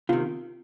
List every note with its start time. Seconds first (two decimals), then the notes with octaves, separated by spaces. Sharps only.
0.09 C3 D#3 F4